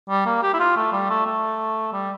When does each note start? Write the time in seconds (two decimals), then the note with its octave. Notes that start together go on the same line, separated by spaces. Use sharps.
0.10 G3
0.26 A#3
0.43 G4
0.54 E4
0.60 F4
0.76 A3
0.93 G3
1.10 A3
1.26 A3
1.93 G3